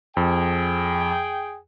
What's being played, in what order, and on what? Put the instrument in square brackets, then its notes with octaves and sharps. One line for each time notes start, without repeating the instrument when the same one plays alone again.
[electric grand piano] F2 [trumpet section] G#4 G5